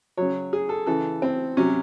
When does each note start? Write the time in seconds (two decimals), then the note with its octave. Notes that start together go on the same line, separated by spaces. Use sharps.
0.17 C#3 F#3 C#5
0.53 G#4
0.69 A4
0.86 C#3 E3 A4
1.22 C4
1.57 C3 F#3 C#4